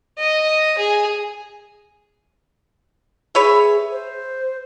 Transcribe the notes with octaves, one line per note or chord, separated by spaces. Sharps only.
D#5
G#4
G#4 B4 C#5 E5
C5